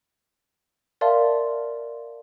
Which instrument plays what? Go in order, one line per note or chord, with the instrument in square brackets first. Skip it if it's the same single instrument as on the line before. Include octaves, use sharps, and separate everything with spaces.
[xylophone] A#4 D5 E5 F5 A5 C6